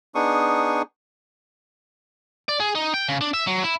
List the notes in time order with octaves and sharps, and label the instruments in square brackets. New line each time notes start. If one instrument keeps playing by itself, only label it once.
[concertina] B3 D4 D#4 G#4 C#6 D#6
[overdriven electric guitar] D5
G#4
D#4
G5
C#3
D4
E5
F#3
E4